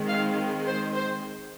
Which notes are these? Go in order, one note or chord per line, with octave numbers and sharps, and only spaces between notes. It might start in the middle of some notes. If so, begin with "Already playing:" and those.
Already playing: D#3 G#3 C4
F5
C5
C5